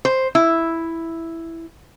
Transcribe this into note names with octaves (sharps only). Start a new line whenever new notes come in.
C5
E4